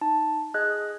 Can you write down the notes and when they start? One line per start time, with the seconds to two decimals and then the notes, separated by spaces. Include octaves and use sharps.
0.01 D#4 A5
0.54 G#4 D#5 F#6 G#6